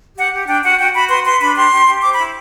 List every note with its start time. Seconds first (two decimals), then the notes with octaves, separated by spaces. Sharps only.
0.17 G4 F#5
0.33 G4
0.47 D4 G5
0.64 F#4 F#5
0.78 F#4 G5
0.93 F#4 B5
1.09 B4 C6
1.24 B4 C6
1.40 D4 B5
1.55 G4 C6
1.72 G4
1.87 G4
2.02 C5 D6
2.14 B5
2.18 E4